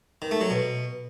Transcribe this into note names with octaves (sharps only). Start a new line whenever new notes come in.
D#3
A3
F#3
B2